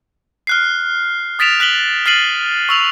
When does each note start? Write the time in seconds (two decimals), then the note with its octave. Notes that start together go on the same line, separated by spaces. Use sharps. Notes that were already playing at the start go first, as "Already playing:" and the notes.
0.47 F6 F#6 C7
1.39 D#6 A6 B6 D7 E7 F7
1.60 F#6 B6 F#7 G7
2.06 F6 A6 C7 D#7 F#7
2.69 C#6 E6 F7